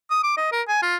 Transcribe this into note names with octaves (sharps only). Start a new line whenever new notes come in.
D#6
D6
D#5
A#4
G#5
F4